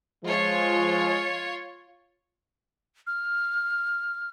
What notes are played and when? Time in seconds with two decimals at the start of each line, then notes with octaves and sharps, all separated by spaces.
0.25 F3 G#3 F4 C#5
3.07 F6